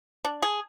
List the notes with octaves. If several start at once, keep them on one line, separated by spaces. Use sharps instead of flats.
D4
G#4